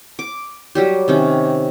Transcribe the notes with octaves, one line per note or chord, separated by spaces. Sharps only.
D6
F#3 G3 G4
C3 D#3 C#4